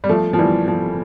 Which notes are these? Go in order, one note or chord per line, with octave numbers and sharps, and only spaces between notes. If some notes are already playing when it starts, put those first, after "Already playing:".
G3
F3 A3
F3
E3 G3
F3